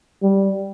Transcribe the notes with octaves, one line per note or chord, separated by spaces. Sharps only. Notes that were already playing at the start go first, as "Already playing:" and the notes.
G3